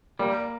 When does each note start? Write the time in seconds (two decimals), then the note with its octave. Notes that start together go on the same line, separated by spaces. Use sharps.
0.19 G3 A#3